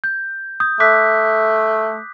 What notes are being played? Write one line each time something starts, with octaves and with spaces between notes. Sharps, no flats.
G6
D#6 G6
A3 D6 F#6 B6